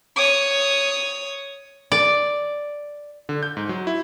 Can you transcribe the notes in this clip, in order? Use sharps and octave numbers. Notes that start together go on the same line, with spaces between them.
C#5 D#6
D5
D3
G6
G#2
F#3
E4